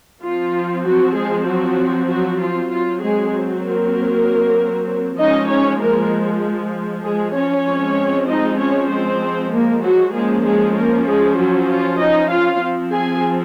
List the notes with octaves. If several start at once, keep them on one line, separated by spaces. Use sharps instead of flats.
F3 C4 F4
F#3 F#4
G#3 G#4
F#3 F#4
F#3 F#4
F4
F#3 C4 F4
G#3 G#4
A#3 A#4
F3 G#3 C#4 D#4 D#5
C#4 C#5
A#3 A#4
G#3 G#4
C#4 C#5
F3 G#3 C4
D#4 D#5
C#4 C#5
C4 C5
A#3 A#4
F#3 F#4
F3 G#3 A#3 C#4 G#4
G#3 G#4
A#3 A#4
G#3 G#4
F#3 F#4
F4
D#4 D#5
F4 F5
F3 C4
G#4 G#5